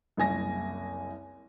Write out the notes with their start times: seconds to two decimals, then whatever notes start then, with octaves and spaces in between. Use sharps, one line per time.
0.17 F#1 C2 G#5 A#6